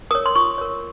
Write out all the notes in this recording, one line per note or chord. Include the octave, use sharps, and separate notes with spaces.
A#4 C#5 D#6
C6
F4 C#6
A#4 C#5